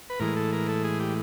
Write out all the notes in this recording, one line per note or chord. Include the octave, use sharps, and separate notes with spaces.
B4
A2 E3 G#3 A#4
A4
A#4
A4
G#4
G4